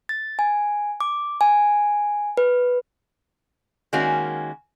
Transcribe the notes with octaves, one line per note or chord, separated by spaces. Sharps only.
A6
G#5
D6
G#5
B4
D#3 G#3 A#3 C#4 F#4